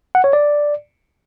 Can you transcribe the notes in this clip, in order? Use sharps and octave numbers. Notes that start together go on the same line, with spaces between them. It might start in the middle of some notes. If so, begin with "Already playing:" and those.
F#5
C#5
D5